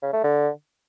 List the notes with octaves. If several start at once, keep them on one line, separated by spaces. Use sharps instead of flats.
C#3
A3
D3